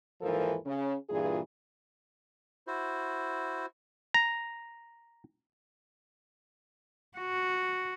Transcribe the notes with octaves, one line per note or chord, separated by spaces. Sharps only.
D#2 G#2 E3 F3 A4 A#4
C#3
G2 A#2 E3 F4 G#4
E4 F#4 C5
A#5
F#4